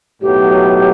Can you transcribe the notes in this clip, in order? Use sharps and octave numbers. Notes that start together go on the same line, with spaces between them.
B1 A2 F#3 B3 G4